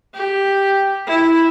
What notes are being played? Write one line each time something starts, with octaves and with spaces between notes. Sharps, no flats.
G4
E4